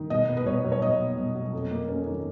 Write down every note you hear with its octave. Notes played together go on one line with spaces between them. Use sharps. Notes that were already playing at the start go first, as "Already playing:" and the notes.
Already playing: D#3
B2 D#5
B3
B4
B2 C#5
F#3
C#5
B2 D#5
B3
B2
F#3
F2
A#3
C#4
D#3